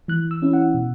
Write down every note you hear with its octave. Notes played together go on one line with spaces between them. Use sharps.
E3 F#6
E6
C#4 E4
F#5
B2